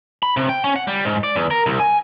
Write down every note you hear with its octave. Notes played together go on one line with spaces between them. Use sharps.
B5
C3
G5
C#4
F#5
G3
G#2
D5
E2
A#4
C2
G#5